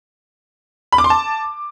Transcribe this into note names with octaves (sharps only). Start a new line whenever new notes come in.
B5
D6
C6
A5